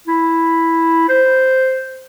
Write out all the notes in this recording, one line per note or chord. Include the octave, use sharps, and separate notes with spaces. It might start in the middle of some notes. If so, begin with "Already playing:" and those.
E4
C5